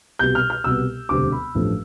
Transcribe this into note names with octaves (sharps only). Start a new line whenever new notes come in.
C2 B2 G3 G6
F6
F6
C2 B2 G3 B3 E6
E1 D2 C3 G3 C4 D6
B5
A1 G2 F3 A3